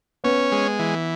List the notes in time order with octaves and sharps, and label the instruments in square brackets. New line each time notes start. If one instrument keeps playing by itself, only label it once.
[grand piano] B3 [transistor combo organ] C#4
[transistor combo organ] G#3
E3